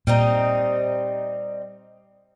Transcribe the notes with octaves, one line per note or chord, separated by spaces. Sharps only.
A#2 G3 C4 D#4